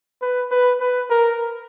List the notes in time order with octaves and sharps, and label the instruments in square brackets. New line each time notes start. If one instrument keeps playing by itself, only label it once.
[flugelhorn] B4
B4
B4
A#4